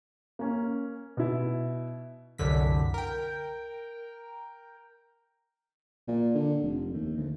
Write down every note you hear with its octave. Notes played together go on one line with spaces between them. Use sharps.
A#3 C#4
B2 E4
C2 F#2 D3 B6
A#4 G5
A#2
D3
F1
D#2
D2